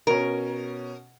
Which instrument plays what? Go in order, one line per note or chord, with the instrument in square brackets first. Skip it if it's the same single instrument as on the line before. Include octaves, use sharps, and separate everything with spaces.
[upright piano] B2 C#4 [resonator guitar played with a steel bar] A#4